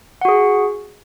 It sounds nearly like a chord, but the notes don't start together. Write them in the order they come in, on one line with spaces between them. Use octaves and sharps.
F#5 F#4 G#4